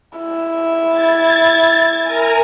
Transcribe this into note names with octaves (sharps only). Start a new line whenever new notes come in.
E4
G#6 A6
A#4 G#5 A#5